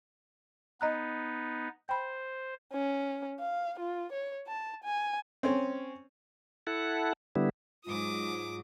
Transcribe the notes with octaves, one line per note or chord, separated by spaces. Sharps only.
B3 D#4 D#5 A#5 F#6
C5 G5 B5
C#4
F5
F4
C#5
A5
G#5
C4 C#4
E4 A4 F#5
D3 G3 B3 E4
G#2 F#3 F4 D6 D#6